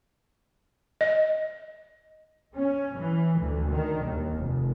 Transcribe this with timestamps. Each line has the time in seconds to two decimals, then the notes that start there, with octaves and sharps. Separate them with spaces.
1.01 D#5
2.55 C#4
2.98 E3
3.40 D2
3.70 D#3
4.05 D#2
4.35 F1